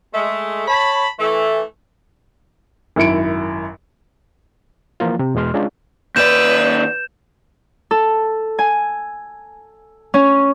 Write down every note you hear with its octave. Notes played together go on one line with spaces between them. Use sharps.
G#3 A3
C#5 A5 B5
E3 A3
G#1 F#2 E4 C#7 D7
E3 F3 A#3 F4
C3 C4
E2 B2 G#3 C6 F6
G#3 C#4 D4 F4
D#2 B4 D5 G6 E7
A4
G#5
C#4